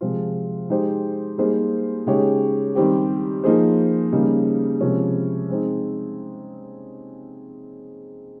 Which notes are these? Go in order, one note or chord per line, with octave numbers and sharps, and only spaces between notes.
C3 F3 G#3 C4 F4
G#3 D#4 G4 C5
G3 A#3 D#4 G#4 C5
C#3 G#3 D#4 G4 C#5
D#3 G3 C4 G4
F3 A#3 D#4 G#4 C5
C#3 G3 A#3 D#4
C3 F3 G#3 C#4
G#3 C4 D#4